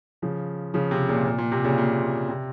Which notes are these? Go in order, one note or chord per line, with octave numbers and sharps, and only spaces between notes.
C#3 F3
C#3 F3
C3
A#2 C#3
A#2
A#2
C3
A#2 C#3
A#2
C3